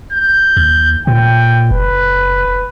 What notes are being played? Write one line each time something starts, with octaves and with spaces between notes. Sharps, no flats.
G6
D#2
A#2 G5
F#1 B4